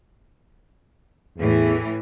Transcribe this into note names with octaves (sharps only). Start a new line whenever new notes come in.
E2 A2 E3